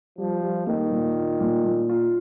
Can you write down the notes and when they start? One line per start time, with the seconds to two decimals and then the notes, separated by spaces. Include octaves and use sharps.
0.18 F3 G3
0.42 G3
0.67 D#3 A#3
0.91 A#2
1.16 F4
1.41 A#2
1.64 A#2
1.89 F4